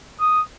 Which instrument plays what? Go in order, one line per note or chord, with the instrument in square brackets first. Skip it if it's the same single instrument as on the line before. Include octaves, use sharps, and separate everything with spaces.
[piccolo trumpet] D#6